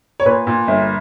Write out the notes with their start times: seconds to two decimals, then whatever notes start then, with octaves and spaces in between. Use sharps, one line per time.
0.20 C#5
0.25 A#2 B4
0.47 A#2
0.68 G1